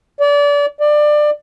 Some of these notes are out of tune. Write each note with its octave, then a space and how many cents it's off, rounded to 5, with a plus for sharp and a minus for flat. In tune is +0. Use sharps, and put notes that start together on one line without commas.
D5 -30
D5 +20